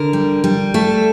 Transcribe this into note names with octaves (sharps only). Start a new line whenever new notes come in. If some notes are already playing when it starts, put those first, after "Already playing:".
Already playing: D3 A#4
G3
G3
A3 A4